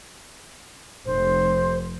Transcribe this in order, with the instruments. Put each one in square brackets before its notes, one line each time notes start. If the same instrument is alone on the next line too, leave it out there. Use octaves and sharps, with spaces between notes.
[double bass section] F1 [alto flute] C5